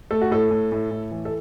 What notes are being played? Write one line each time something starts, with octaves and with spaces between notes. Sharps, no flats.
A3 A4
F#4
A2 A4
A2
A2
A2
E3
A4